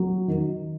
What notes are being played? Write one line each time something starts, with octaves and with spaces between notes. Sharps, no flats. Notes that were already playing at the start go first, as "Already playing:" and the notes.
Already playing: F#3
D#3